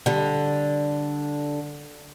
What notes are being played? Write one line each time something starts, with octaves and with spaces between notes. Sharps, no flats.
D3 G3